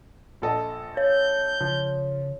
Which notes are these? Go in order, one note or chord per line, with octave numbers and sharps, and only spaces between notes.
A#1 A4 D#5
C#5 G6
C#3 F3